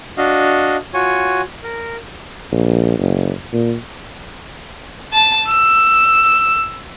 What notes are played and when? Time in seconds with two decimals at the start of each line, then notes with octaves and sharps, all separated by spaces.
0.17 D4 F#4 D#5 F5
0.94 F4 F#4 C#5 G#5
1.63 A#4
2.52 A#1
2.98 F#1
3.53 A#2
5.13 A5
5.48 E6